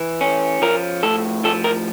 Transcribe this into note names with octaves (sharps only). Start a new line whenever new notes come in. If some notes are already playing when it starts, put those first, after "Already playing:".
Already playing: E3
C#4
F3 A#4
A2 A4
F3 A4
A#4